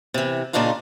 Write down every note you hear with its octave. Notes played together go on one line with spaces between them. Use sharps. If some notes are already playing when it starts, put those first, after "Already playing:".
C3 E3
A#2 C#3 D4 D#4 F4